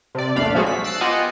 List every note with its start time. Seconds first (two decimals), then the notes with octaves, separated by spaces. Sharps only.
0.15 C3 D5
0.35 A#1 E2 A3 D4 F5 B5
0.54 F3 F#3 G#3 F#4 G#4 A4
0.66 B6
0.84 E6 F#6 A6 C7 D7
1.01 B3 F4 G4 D#5 F#5 G#5